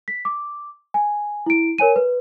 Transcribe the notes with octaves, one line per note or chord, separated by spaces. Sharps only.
B6
D6
G#5
E4 D7
A#4 C#5 G#5 D#7
B4